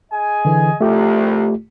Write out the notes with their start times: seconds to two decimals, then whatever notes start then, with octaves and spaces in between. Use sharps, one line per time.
0.12 G#4 D#5 G#5
0.45 D3 E3
0.81 C2 A3 F4 G4